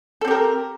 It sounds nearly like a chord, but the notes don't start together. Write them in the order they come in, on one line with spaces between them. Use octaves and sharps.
A4 C4 G4 A#4